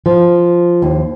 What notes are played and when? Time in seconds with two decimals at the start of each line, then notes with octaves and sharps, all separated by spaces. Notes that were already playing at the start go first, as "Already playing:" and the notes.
0.06 F3
0.82 D#2